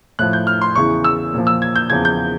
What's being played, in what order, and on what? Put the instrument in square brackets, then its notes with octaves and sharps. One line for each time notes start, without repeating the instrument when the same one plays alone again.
[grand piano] A2 F3 F#6
G6
F6
C6
E2 C#3 E3 C#6
E6
A#2 F3
E6
G#6
G6
E2 C#3 F3 G#6
G6